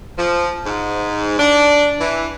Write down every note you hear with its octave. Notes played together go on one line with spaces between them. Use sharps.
F3
G#2
D4
E3